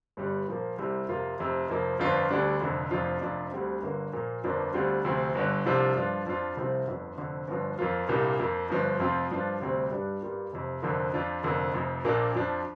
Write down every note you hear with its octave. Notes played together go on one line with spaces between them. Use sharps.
G1 G2 G3
A#2 F3 A#3
C2 C3 G3
F2 C3 A#3 F4
F1 F2 C3
F1 F2 F3 A#3
G1 F2 F3 D4 F4
D2 D3 G3 D4
F1 F2 D3
F1 F2 F3 D4 F4
F1 F2 F3 D4 F4
D2 D3 G3 C4
G1 G2 D3 A#3
A#2 F3 A#3
G1 F2 F3 A#3 D4
D2 D3 G3 C4 F4
D2 C3 F3 C4
G1 G2 D3
C2 C3 F3 D4 F4
G2 F3 D4 F4
F2 F3 D4 F4
C2 C3 F3 C4 F4
G1 F2 D3 F3
F1 F2 D3
G1 G2 D3 F3
F2 F3 A#3 F4
C2 A#2 G3 A#3 D4
F2 F3 A#3
G1 G2 F3
F1 F2 F3 C4 F4
G2 F3 D4 F4
D2 C3 G3 C4
G2 G3 D4
G2 G3 A#3 F4
F1 F2 C3
F1 F2 D3 F3 A#3
F2 F3 D4 F4
F1 F2 D3 A#3
F1 F2 F3
A#1 A#2 A#3 D4
F2 F3 D4 F4